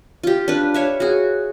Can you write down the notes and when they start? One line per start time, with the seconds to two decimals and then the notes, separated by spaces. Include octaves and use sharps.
0.23 F4 G4
0.48 D4 B4
0.74 C#5 E5 F5
1.00 F#4 G#4